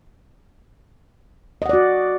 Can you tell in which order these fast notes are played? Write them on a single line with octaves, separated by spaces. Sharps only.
D#5 F#5 D5 F#4